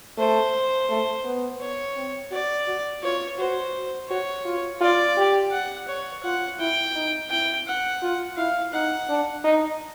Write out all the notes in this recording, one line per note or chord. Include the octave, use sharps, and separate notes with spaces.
A3 C5
A3
B3
C#5
C4
F#4 D5
F#4
F4 C#5
F#4 C5
F#4 C#5
F4
F4 D5
G4
F#5
C#5
F4 F#5
E4 G5
D#4
E4 G5
F#5
F4
E4 F5
D#4 F#5
D4
D#4